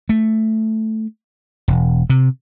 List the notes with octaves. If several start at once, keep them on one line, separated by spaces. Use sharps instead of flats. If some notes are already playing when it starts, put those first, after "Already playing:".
A3
E1
C3